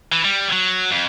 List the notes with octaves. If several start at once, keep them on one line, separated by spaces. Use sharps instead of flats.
E3
G3
F#3
F2